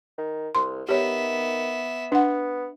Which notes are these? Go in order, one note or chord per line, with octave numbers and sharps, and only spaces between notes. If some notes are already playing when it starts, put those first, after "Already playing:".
D#3
C2 C6
D#3 B3 G4 C#5 E5
B3 D4 F#5